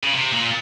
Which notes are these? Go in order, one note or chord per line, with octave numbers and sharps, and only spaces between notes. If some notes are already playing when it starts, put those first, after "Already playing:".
C#3
C3
A#2